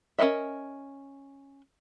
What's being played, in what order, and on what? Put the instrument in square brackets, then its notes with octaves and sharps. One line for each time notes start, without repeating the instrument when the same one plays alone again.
[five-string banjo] C#4 G#4 A#4 D#5 E5